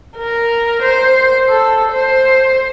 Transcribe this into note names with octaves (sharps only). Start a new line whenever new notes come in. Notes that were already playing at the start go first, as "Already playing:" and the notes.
A#4
C5
A4
C5